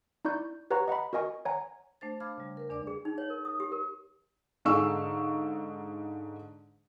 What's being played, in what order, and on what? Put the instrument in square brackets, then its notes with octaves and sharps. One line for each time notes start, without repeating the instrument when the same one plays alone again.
[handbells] D#4 E4 D5 C#6 G6
G4 B4 C#5 F#5 A#5 C#6
D#5 F#5 A#5 B5
F#4 A#4 D#5 G#5 C#6
C#5 F#5 G#5 A#5
[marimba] A3 D4 C5 A6
F5 B5 D6 F6 G#6
C#3 G3
A#4 B4
E2 D4 D5 D6
[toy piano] G#4
D#4
C#5
A#4
D#6
G4
A#4
[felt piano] G#2 D3 G#4 F5 C#6 E6